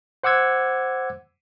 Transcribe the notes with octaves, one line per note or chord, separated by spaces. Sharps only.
C5 F#5 D6 E6 G#6